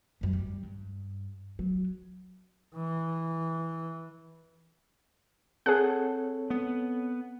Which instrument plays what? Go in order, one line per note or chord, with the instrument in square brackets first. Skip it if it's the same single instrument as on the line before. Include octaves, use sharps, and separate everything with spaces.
[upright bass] F#2 G3
G3
G2
F#3
[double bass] E3
[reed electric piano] C4 A4 C#5 [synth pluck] G#4 F#5
[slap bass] B3